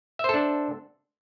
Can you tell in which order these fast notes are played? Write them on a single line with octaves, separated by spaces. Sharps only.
E5 C5 A4 D4